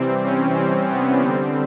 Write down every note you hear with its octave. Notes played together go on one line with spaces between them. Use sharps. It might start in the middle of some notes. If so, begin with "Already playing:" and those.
Already playing: C3 E3 G3 C4
C#4
C4
B3
D3 G3 C4